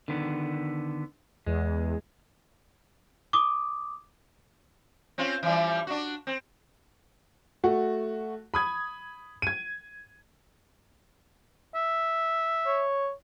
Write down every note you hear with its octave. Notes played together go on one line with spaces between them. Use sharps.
D3 D#3 B3
E2 G#3
D6 D#6
C4 C#4 F4
E3 F3 G3
D4 F#4
C4
A3 F#4
B5 D#6 G#6
G#6 D#7
E5
C#5